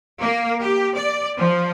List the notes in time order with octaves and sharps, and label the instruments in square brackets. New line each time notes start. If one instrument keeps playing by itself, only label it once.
[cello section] A#3
G4
D5
F3